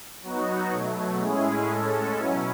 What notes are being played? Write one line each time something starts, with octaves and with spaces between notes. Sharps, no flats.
F#3 B3 D#4 F#4
B2 F#3 A3
A2 G#3 C#4 E4 G#4
A2 G#3 C#4 A4
B2 F#3 C#4 E4